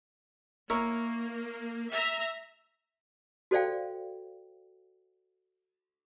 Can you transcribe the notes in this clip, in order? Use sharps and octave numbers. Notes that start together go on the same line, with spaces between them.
A#3 E4 A#4 C#5
E5 A#5
F#4 A4 C5 D5 F5 G5